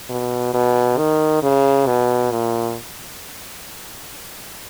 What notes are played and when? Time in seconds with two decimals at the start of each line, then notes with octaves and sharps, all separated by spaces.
0.09 B2
0.54 B2
0.98 D#3
1.43 C#3
1.87 B2
2.31 A#2